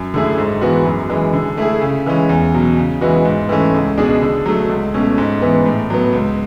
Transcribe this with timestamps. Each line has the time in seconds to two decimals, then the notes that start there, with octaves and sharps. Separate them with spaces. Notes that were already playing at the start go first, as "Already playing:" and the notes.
Already playing: F#2
0.14 D3 A3 E4 G#4
0.38 G#2
0.61 E3 G#3 B3 F#4
0.85 F#2
1.09 E3 G#3
1.33 D3
1.57 A3 E4 G#4
1.81 C#3
2.06 E3 G#3 C#4
2.29 E2
2.54 B2 F#3
2.77 C#3
3.01 E3 G#3 B3 F#4
3.25 G#2
3.49 E3 A3 C#4
3.74 C#2
3.97 B2 G#3 D4 G#4
4.22 D3
4.46 F#3 A3
4.69 C#2
4.94 B2 A3 C#4
5.18 G#2
5.42 E3 B3
5.66 A2
5.90 F#3 B3
6.13 C#2